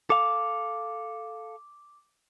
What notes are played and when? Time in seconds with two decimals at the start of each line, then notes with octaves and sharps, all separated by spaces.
0.10 A4 F5 D6